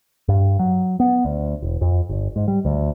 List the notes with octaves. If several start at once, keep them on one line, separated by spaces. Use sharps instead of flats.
G2
F#3
B3
D2
E1
F2
G1
G#2
G3
D2